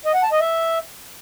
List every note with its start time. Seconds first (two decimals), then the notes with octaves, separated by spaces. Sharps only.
0.05 D#5
0.14 F#5
0.23 A5
0.32 D#5
0.41 E5